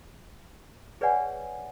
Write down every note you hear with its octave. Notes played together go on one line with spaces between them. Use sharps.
G#4 B4 C#5 D5 F#5 G#5